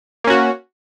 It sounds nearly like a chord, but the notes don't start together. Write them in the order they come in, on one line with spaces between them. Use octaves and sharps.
A#3 C#4 F#4